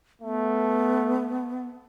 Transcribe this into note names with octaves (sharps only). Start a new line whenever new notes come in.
A3 B3